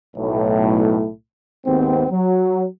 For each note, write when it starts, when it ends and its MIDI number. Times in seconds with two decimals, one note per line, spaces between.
0.16 1.07 35
0.16 1.07 45
1.65 2.05 39
1.65 2.05 44
1.65 2.05 59
1.65 2.05 60
2.10 2.65 54